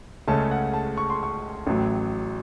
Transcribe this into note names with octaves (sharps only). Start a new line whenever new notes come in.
C#2 C#3 A3 C#4 A5
F#5
A5
C#6
C6
C#6
A1 A2 F#3